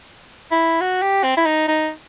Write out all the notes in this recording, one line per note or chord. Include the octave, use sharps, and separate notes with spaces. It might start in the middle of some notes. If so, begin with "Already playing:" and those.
E4
F#4
G4
C4
E4
D#4
D#4